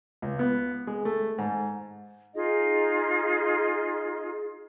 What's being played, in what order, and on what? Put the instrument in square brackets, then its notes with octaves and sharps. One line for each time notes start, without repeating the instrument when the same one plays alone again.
[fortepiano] C#2
B3
G#3
A3
G#2
[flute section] D#4 F4 G#4 D#5